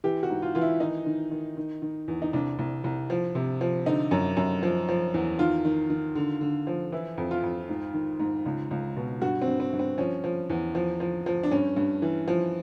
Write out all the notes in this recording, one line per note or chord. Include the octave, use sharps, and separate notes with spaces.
E3 G4
F#4
G#2
F4
E3 F4
E4
D#3 D#4
D#3
D#3
D#3
D#3
E2
D#4
C2 D4
C2
C2
F3
C3
F3
D3 D#4
F#2
F#2
F3
F3
E2
D#3 F4
D#3
D#3
D3
D3
F3
E3 E4
F2
F4
F2
G#2
D#3
G#2
C#2
C#2
B2
G2 F#4
C4
G2
C4
G2
C4
F3 C#4
F3
E2
F3
F3
F3
D4
G2 C#4
G2
E3
F3